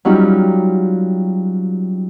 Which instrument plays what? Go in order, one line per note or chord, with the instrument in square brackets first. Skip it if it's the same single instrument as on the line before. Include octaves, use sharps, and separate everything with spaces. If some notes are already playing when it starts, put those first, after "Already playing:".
[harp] F#3 G3 C#4 D#4 F4 G4